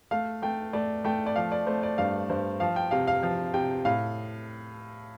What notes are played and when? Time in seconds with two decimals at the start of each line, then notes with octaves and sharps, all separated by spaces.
0.11 A3 F5
0.42 A3 G5
0.73 A3 D5
1.05 A3 G5
1.26 D5
1.36 F3 F5
1.52 D5
1.66 A3 C5
1.83 D5
1.98 G2 F5
2.29 G2 C5
2.60 F3 F5
2.76 G5
2.91 C3 F5
3.07 F5
3.23 F3 F5
3.54 C3 G5
3.85 A2 F5